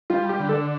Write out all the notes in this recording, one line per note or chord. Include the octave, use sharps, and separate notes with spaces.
G3 F4
G4
D3
A4